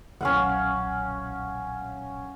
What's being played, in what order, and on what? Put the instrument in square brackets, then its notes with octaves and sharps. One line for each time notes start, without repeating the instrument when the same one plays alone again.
[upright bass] D#1 B1 [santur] C#4 F5 F#5